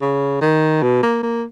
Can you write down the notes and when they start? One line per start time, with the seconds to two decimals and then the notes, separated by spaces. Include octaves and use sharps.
0.01 C#3
0.42 D#3
0.83 B2
1.03 A#3
1.23 A#3